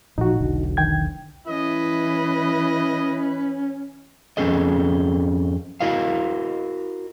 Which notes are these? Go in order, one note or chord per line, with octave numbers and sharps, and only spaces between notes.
A1 A#2 F3 D#4 F#4
E1 B1 D3
D#3 G5 G#6
E3 C#4 E4 B4 D#5
F2 G#2 C#4 G#4 A4 D#5
E4 F#4 A#4 D#5 F5